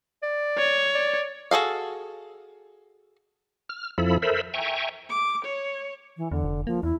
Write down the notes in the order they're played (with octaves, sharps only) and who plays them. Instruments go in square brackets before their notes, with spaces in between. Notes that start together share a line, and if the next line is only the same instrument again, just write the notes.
[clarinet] D5
[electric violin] C#5
[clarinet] D5
[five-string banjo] F#4 G#4 A4 F5
[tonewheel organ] F6
F2 F3 E4 A4 B5
A4 A#4 C5 E5 B5
E5 G5 G#5 A#5 C#6
[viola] D6
C#5
[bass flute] E3
[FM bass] E2 [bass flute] D3
[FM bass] F1
[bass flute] F3 [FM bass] A#3
[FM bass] E2 [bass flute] E4